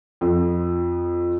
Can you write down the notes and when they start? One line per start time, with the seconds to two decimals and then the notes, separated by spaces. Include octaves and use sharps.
0.21 F2 F3